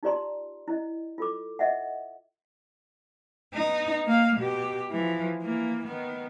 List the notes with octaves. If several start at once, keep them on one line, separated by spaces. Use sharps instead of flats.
D#4 F4 G4 D5 A#5 C6
E4 D#5
F4 A4 D6
D#5 E5 F#5
B3 D#4
A#3 F5
B2 G4
E3 F3
E3 A#3
D#3 B3